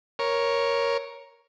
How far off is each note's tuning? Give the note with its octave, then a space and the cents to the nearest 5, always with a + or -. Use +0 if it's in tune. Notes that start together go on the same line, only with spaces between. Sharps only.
A#4 +10 C#5 +0